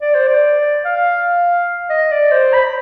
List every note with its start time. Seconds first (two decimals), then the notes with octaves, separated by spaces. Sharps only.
0.02 D5
0.15 C5
0.28 D5
0.85 F5
1.90 D#5
2.11 D5
2.32 C5
2.54 B5